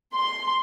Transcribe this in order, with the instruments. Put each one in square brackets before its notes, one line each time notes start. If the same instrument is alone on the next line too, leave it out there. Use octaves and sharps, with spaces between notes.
[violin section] C6